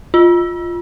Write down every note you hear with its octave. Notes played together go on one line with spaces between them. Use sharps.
F4